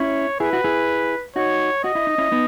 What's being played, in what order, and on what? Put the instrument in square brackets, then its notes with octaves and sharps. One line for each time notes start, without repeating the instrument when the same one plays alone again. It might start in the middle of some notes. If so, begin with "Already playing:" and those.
Already playing: [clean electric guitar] C#4 E4 [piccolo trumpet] C#5
[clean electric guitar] E4 G#4 [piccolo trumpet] B4
[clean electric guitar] F#4
E4 G#4
[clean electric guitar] D#4 F#4 [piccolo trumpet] C#5
[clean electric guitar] F#4 [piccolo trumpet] D#5
[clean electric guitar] E4
D#4
C#4 E4
B3 D#4